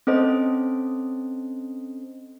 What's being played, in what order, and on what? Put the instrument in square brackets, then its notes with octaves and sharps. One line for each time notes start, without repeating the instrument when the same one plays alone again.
[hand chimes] C4 C#4 A4 C5 D#5